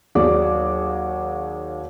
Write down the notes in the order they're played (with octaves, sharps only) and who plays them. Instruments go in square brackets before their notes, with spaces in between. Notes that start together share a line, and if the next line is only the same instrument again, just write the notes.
[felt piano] D#2 F#3 F#4 G#4 D5 D6